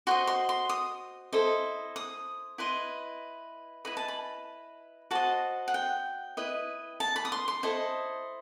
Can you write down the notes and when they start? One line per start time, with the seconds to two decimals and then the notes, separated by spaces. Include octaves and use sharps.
0.07 F#4 C5 D#5 C6
0.27 C6
0.49 C6
0.69 D#6
1.33 E4 A4 C5 D#5
1.96 D#6
2.58 E4 B4 D#5 C6
3.85 E4 B4 D#5 B5
3.97 A5
4.08 B5
5.11 F#4 C5 D#5 A5
5.68 F#5
5.74 G5
6.37 E4 B4 D#5
7.00 A5
7.16 B5
7.25 D#6
7.32 C6
7.48 C6
7.63 E4 A4 C5 D#5